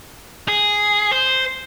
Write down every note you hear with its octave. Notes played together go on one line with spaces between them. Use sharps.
G#4
C5